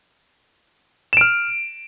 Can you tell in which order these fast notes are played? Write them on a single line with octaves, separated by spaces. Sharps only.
E7 D7 F6